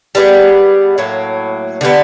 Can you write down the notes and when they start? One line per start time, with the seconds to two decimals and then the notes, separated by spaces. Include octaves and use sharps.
0.15 G3 B3 D#4 G#4
0.98 A2 F#3 A#3
1.81 D3 G3 B3